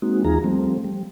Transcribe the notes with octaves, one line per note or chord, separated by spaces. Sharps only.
G#3 A#3 C4 D#4 F#4
D#2 E3 D#4 F4 G#4 A#5
F3 G3 A3 C4
G3